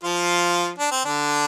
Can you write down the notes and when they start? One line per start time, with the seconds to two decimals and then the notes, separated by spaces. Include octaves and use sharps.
0.04 F3 F4
0.79 D4
0.91 C4
1.05 D3 D4